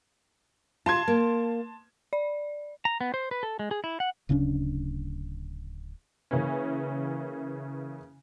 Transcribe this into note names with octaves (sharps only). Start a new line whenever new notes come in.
F4 A5 C6 G#6
A#3
D5
A#5
B3
C5
B4
A4
G#3
G#4
E4
F#5
D1 C#3 C#4 D4
C#3 E3 A#3 C#4